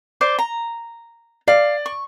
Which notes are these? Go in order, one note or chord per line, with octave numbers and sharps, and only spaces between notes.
C5 D5 D6
A#5
D5 F5
C#6